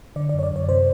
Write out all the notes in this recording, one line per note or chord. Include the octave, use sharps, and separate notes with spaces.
D3 D5
D5
F#2 C#5
D5
F#2 C#5
C3 C5